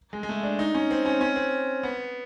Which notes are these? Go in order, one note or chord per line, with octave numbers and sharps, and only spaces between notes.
G#3
G#3
A3
D4
D#4
C#4
C4
C#4
C#4
C4
B3